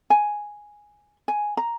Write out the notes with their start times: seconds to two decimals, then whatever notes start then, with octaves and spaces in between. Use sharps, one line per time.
0.10 G#5
1.28 G#5
1.57 A#5